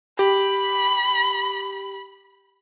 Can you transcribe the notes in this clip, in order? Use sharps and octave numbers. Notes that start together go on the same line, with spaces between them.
G4 B5